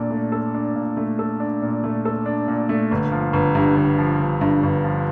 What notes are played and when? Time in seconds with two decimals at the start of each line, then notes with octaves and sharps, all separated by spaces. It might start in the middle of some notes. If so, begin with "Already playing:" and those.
Already playing: A#2 D4 A4
0.11 A3
0.32 A4
0.54 D4
0.76 A#2
0.97 A3
1.19 A4
1.40 D4
1.62 A#2
1.84 A3
2.05 A4
2.26 D4
2.48 A#2
2.69 A3
2.91 G1
3.12 F3
3.33 G1
3.55 G2
3.76 G1
3.98 F3
4.19 G1
4.41 G2
4.63 G1
4.84 F3